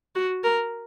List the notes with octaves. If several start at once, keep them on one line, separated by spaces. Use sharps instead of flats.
F#4
A#4